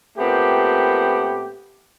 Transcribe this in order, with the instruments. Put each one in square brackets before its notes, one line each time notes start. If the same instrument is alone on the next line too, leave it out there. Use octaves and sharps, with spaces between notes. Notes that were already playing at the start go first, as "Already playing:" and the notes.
[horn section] A#2 A3 B3 C4 G4